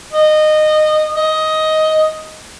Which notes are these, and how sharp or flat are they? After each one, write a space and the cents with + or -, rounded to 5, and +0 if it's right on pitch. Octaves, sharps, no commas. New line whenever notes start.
D#5 -20
D#5 +10